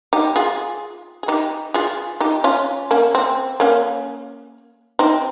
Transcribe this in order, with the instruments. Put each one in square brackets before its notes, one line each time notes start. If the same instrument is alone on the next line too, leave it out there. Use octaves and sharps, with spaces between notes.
[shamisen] D#4 G4
F4 G#4
G#4
D#4 G4
F4 G#4
D#4 G4
C#4 F4
A#3 C#4
C4
A#3 C#4
C4 D#4